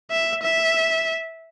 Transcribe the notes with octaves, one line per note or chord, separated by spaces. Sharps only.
E5
E5